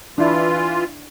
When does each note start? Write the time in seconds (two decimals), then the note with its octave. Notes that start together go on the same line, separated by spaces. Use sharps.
0.18 E3 D4 E4 F4